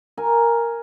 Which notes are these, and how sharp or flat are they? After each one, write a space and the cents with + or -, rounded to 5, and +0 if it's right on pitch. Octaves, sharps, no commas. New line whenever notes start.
A#4 +0 G#5 +0